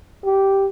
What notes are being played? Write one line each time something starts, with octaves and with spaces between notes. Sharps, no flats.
G4